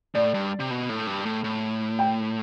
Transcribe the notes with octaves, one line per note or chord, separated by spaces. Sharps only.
A2 D5
G2
C3
B2
A2
G2
A2
A2
G5